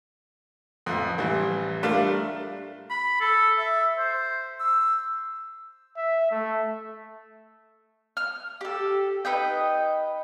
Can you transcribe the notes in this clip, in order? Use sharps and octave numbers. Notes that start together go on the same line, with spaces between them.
A1 F2
A1 E3 G3
G3 A3 D4 F4 A#4 F5
B5
A4
E5
C5
E6
E5
A3
F6
G4 A4
D#4 B4 D#5 G5